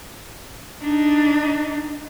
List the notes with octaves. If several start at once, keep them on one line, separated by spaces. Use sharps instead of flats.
D4 D#4